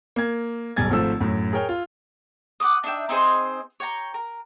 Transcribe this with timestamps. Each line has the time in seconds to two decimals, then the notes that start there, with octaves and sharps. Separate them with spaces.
0.16 A#3 G#6
0.76 F#1 B1 G3 G#5 G#6 A6
0.91 G#1 F3 A3 E6
1.20 F#2 A2
1.53 G#4 A#4 C#5 G5 F6
1.69 F4
2.60 F#5 B5 D6 D#6
2.84 D4 D#4 E5 G5
3.09 C4 D#4 G#4 C5
3.80 C#5 G5 A#5
4.14 A#4